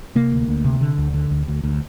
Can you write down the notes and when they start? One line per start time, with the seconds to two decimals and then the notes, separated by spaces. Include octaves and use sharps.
0.15 C3 A#3
0.32 D2
0.48 D2
0.65 C3
0.81 D3
0.98 D2
1.14 D3
1.31 D2
1.48 D2
1.63 D2